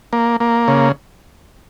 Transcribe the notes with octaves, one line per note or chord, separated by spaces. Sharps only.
A#3
A#3
C#3